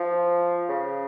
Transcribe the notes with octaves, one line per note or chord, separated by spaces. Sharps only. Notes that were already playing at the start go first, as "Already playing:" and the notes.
Already playing: F3
C#3